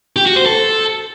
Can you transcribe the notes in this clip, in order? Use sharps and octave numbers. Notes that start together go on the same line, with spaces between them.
G4
F#4
C5
A4